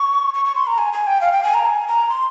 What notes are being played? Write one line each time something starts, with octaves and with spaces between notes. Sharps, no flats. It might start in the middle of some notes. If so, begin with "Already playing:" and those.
Already playing: C#6
C#6
C#6
C6
A#5
G#5
G#5
G5
F5
G5
G#5
A#5
G#5
A#5
C6